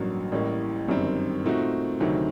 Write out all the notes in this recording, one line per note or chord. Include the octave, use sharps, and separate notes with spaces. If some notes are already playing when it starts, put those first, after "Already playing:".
Already playing: A1 G2 F#3 A#3
A1 A2 G3 A#3
G1 F#2 D#3 G3 C4
A#2 A3 C4 D#4 F#4
D2 C3 D#3 F#3 C4